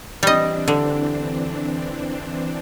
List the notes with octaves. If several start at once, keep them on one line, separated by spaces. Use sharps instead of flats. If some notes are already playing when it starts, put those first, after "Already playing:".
E3 G3 C4 D4 D#5
D3